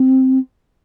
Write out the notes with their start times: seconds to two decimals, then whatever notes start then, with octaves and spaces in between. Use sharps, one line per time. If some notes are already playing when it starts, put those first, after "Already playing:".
Already playing: C4